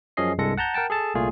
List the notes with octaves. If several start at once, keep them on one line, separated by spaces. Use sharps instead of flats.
F#2 F3 C#4 G#4 D#5 C7
C2 G2 G#3 A4 A#6 C#7
F#5 A5 A#5 G6
A#4 F#5 G5 A5
G#4 A4 A5
C2 A#2 A3 F4 G#4